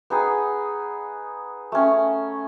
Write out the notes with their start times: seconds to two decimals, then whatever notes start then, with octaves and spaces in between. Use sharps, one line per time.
0.10 B3 D#4 G#4
1.72 A3 C#4